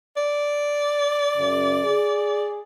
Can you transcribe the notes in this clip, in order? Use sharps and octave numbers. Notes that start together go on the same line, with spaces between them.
D5
F#2 C#3
G#4